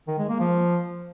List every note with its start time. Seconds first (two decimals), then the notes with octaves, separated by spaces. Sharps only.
0.07 D#3
0.18 G#3
0.29 A#3
0.40 F3